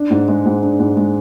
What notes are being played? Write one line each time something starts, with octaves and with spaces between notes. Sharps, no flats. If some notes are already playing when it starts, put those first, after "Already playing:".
Already playing: D4
G#2
G#3
G#2
D4
G#2
G#3